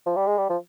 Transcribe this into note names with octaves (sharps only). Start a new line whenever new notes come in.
F3
G3
G#3
G3
F3